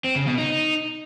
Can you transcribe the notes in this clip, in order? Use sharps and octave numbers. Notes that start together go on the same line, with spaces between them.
C4
C#3
B2
D#4